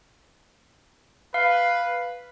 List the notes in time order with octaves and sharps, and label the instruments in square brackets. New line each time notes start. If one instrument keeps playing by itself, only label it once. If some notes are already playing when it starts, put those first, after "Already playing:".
[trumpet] B4 [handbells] F5